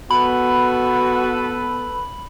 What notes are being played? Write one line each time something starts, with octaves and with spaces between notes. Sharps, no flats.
B3 F#4 A4 B4 B5